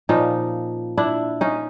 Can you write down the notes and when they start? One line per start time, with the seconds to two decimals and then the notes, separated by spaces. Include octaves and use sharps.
0.09 A#2 F3 C#4 D#4
0.98 D4 E4
1.41 C#4 D#4